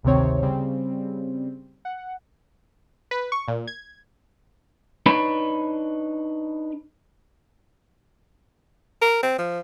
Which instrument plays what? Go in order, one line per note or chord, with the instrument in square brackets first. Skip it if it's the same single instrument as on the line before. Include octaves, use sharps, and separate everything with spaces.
[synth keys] G#1 D2 C3 D#3 C4 C#5
C#3 G3 C4
F#5
[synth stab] B4
C#6
A#2
G#6
[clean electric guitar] D4 D#4 B4 C#5 B5
[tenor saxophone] A#4
C4
F3